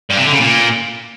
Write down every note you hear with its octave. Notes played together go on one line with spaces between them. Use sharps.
G2
C3
D3
C#3
A#2